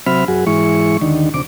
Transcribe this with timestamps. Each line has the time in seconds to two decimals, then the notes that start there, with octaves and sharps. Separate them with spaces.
0.06 C3 F#3 C4 E5 B5 F6
0.28 F#2 F#4 G#4
0.47 G#2 E3 G#3 E4 C#6
1.01 D#2 D3 D#3
1.34 D2 C3 D6